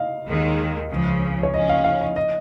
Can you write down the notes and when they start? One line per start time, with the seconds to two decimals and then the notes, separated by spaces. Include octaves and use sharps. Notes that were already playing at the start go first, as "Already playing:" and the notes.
Already playing: D#5 F5
0.27 D#2 D#3 G#3
0.90 C#2 C#3 F3
1.43 C#5
1.53 C#3 F3 C#4 D#5
1.69 F5
1.84 F5
2.01 D#5
2.16 D#5